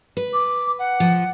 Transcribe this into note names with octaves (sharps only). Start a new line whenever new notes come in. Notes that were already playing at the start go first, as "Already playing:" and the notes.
B4
D6
F#5
F3